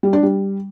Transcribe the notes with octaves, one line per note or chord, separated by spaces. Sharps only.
G3
D4
G3